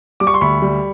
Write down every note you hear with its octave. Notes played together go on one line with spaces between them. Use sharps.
G3 D6
C#6
C6
D2 B5 C#6
G3